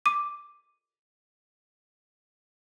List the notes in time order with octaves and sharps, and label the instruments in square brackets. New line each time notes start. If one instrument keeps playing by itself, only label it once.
[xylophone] D6 D#7